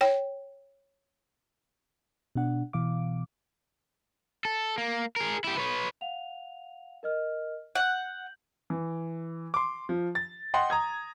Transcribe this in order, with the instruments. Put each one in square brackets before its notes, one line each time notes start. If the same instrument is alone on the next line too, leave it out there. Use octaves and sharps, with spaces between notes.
[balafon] C#5 G5
[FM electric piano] B2 D4 F#5
B2 E3 F5 D6
[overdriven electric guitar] A4
A#3
G#4 A#4
E4 G4
B4 C#5
[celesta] F5 F#5 F7
A#4 D#5 F6
[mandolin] F#5 [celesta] G6 F#7
[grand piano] E3
C6 D6
F3
A6
D#5 F#5 G5 C6
A#5 D#6 G#6